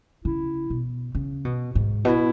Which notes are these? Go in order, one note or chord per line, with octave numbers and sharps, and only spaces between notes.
C#3 E4
B2
C#3
B2
G#2
B2 E4